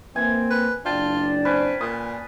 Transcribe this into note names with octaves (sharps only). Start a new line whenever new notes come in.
E3 A#3 C4 G#5
B4
F#1 D4 F4 D5 G5 A5
C4 C#4 B4
A#2 D#6